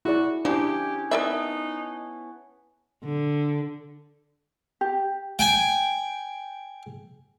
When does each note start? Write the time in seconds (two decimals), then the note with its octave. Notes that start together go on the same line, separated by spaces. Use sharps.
0.05 E4 F#4 G#4 D5
0.45 F3 C#4 D4 E4 G4 G#4
1.11 B3 D#4 E4 A#4 D5 E5 A5
3.03 D3
4.81 G4
5.39 G5 G#5